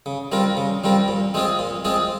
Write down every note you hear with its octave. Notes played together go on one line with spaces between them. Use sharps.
C#3
G3 C4 F4 A#4
C#3
G3 C4 F4 A#4
A#2
G#3 C4 F4 G#4
A#2
G#3 C4 F4 G#4